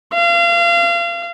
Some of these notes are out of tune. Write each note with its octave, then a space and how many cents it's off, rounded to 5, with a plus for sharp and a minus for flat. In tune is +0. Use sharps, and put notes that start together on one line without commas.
F5 -30